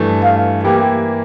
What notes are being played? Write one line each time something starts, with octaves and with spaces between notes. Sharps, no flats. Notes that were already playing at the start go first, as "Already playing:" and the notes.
Already playing: G2 E3 A3
F5
E3 A#3 E4 G4